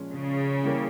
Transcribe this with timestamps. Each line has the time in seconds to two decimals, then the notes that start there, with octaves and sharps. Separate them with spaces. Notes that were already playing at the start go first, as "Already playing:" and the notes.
Already playing: A#2 F3 G#3 C#4
0.12 C#3
0.64 E3 G3 A#3